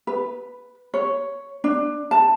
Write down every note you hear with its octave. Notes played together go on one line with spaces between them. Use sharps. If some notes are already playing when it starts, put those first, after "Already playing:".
B4
C#5
D4
A5